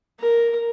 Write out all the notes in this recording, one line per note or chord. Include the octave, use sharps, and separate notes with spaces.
A#4